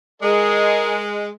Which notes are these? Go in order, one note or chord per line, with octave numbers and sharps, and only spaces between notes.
G#3 G#4 A#4 D#5